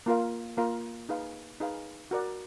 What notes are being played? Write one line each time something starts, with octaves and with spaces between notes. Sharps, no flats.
A#3 F4 A#4 F5
A#3 F4 A#4 F5
D#4 G#4 B4 F5
D#4 G#4 B4 F5
F#4 A#4 D5 F#5